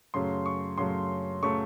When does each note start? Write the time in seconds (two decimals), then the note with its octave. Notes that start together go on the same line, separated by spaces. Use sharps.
0.14 F#2 C#3 F#3 A3 C6
0.46 C#6
0.78 F#2 C#3 F#3 A3 C6
1.43 C#3 F#3 A3 C#6